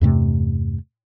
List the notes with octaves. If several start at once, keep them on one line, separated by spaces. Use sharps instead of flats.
E2 G2 C3 A3